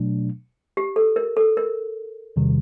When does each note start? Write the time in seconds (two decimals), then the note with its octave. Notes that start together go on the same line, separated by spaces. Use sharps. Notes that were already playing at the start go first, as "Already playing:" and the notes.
Already playing: B2 F#3 A3 D4
0.77 G4
0.96 A4
1.16 A#4
1.37 A4
1.57 A#4
2.36 E2 C3 D#3 G3